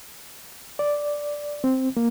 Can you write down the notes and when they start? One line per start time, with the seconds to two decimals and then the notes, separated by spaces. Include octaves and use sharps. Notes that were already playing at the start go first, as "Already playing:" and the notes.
0.79 D5
1.64 C4
1.97 A#3